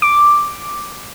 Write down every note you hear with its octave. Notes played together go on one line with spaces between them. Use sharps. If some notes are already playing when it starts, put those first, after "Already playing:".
D6